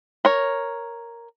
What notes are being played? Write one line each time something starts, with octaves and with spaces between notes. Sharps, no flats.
A#4 C#5